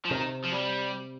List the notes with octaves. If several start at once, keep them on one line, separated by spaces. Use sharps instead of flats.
F3
C3 D#3
F3
G3